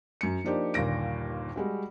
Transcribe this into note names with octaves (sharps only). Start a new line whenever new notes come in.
F#2 C#7
F3 A#3 D4 D#4 G4 C5
G1 D#2 A#2 A#6 D7
G3 G#3 F#4